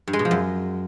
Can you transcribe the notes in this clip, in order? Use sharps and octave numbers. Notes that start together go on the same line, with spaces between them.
G2
G#3
B2
F3
F#2